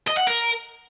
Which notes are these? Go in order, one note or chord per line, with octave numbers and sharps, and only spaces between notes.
D#5
F#5
A#4